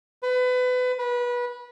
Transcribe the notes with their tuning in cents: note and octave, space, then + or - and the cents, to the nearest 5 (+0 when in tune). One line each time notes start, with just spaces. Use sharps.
B4 +30
B4 -25